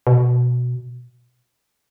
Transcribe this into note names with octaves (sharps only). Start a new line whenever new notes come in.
B2